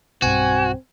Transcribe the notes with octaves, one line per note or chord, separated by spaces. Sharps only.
B1 G2 C4 F#4 G#5